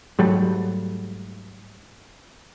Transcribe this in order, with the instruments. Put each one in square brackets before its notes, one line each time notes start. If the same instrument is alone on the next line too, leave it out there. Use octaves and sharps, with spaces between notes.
[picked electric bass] G#2 F#3 G3 A3